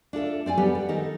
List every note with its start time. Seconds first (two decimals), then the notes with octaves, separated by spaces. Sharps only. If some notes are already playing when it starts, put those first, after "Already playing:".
0.13 D4 F4 A4 E5
0.46 C4 D5 F5 G#5
0.58 G3 B3 G4 A4 B4
0.75 G3
0.89 D#3 D#4 A4